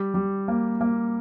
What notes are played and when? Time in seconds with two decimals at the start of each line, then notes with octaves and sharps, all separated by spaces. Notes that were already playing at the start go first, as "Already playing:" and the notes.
Already playing: G3
0.14 G3
0.48 A#3
0.81 A#3